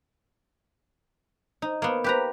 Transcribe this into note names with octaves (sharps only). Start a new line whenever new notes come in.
D#4
A#3 B3
G4 B4 A#5